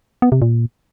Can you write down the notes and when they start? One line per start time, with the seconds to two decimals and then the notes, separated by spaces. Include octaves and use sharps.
0.22 B3
0.32 C3
0.42 A#2